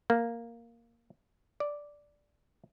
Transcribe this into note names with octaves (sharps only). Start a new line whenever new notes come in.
A#3
D5